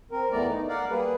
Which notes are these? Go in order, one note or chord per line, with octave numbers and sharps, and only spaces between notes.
C4 A#4
E2 E3 A3 B3 D5 A#5
D#4
A#4 D5 F5 F#5
G3 A#3 G#4 B4